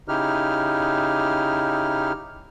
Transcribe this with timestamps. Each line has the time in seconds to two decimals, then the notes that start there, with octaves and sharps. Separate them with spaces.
0.08 C#3 D#4 E4 G4 F6